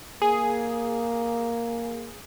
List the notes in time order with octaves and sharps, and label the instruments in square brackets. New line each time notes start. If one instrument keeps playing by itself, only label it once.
[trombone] A#3 [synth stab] G#4